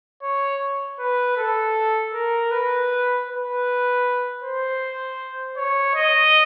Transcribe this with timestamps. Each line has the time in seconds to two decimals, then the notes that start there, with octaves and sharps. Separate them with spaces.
0.22 C#5
0.99 B4
1.37 A4
2.14 A#4
2.51 B4
3.28 B4
4.42 C5
5.57 C#5
5.95 D#5